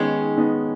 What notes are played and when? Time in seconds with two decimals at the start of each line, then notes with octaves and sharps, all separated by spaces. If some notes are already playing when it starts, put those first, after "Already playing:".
Already playing: D#3 G#3 B3 C#4 D#4 G#4
0.37 B3 D#4